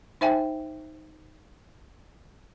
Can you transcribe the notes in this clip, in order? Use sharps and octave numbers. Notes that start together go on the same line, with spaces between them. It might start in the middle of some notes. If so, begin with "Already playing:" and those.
D#4 C5 E5 G5 G#5